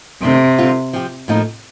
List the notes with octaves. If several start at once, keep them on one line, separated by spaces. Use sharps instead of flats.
C3 D#3 A3 D4
D3 G3 C4 F4
F3 C4 G4
A2 F3 A#3 D#4